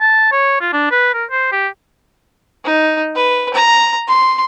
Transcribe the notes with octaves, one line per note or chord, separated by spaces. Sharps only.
A5
C#5
F4
D4
B4
A#4
C5
G4
D#4
B4
A#5
C6